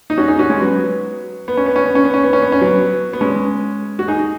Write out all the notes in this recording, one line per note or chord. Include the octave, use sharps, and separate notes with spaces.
D#4
C#4 F#4
D#4 G#4
C#4 F#4
G#3 C#4
F#3 B3
B3
C#4
B3
C#4
B3
C#4
B3
C#4
B3
C#4
B3
C#4
F#3 B3
B3
G#3 C#4
F#4
D#4 G#4